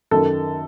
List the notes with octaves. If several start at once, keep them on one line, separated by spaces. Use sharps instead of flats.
F#2 D#3 A4